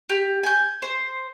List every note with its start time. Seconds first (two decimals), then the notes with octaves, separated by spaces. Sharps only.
0.09 G4
0.43 G#5 G6
0.82 C5